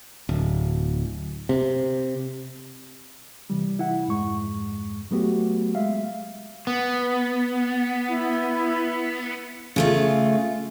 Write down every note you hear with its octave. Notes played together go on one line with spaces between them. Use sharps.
D1
C3
C3 E3 G3
E4 F#5
F2 G#2 G#3 C#6
F#3 A3 B3 F#4 G4
G#3 E5 F5
B3
E4
C#3 A3 F4